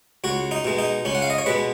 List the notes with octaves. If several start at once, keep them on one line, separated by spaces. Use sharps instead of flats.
C#2 F#4
D#4
B2 G#3
D#4
C#2 C#4
F#5
F5
D#5
C#5
B2 G#3 B4